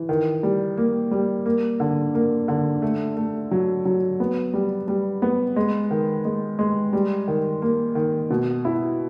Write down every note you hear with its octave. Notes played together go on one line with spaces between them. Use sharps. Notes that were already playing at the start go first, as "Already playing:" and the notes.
Already playing: E3
D#3
G3
A#3
G3
A#3
D3
A#3
D3
A3
A3
F#3
F#3
B3
G3
G3
B3
G#3
D#3
G#3
G#3
G3
D#3
A#3
D#3
B2
E4